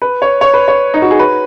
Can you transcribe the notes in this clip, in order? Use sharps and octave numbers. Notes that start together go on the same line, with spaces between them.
B4
C#5
C#5
B4
C#5
D#4
F#4
G#4
B4